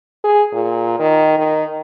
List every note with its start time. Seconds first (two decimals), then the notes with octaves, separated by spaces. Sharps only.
0.24 G#4
0.53 A#2
0.99 D#3
1.39 D#3